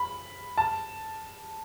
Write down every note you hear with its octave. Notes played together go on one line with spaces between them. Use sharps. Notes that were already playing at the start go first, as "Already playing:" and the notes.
Already playing: B5
A5